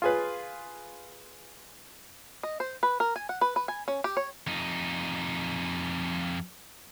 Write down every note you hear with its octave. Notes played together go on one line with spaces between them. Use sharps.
F4 G#4 B4
D#5
C5
B4
A#4
G#5
F#5
B4
B4
G#5
C#4
G4
C#5
F2 D#4